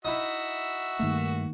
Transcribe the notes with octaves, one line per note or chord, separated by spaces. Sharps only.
D#4 E4 F#4 E5
G2 D#3 A3 A#3